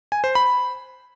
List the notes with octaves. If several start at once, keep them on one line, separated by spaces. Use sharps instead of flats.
G#5
C5
B5